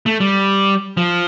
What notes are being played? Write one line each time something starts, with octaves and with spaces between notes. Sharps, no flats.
A3
G3
F3